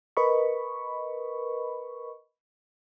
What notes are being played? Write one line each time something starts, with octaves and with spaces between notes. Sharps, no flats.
A#4 B4 D#5 B5 C#6